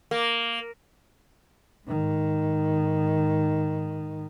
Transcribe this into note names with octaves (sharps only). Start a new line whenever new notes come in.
A#3
G#2 D#3